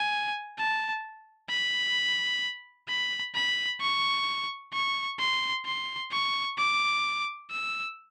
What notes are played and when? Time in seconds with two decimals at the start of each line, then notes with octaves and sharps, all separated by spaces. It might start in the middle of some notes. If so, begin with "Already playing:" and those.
Already playing: G#5
0.58 A5
1.50 B5
2.88 B5
3.35 B5
3.81 C#6
4.73 C#6
5.19 C6
5.66 C6
6.12 C#6
6.58 D6
7.50 E6